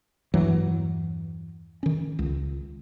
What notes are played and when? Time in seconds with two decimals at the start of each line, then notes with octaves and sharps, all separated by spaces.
0.34 E2 G2 E3 F#3
1.83 D#3 C#4
2.19 C#2